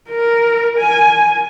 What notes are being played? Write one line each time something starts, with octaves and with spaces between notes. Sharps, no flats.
A#4
G#5